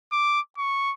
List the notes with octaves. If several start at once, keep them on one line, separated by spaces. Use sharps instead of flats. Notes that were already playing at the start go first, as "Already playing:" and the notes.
D6
C#6